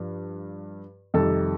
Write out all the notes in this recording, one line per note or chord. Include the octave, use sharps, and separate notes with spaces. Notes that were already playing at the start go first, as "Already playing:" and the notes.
Already playing: G2 F3
F2 C3 D#3 G3 A4